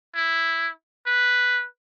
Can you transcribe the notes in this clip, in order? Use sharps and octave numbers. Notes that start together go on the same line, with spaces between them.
E4
B4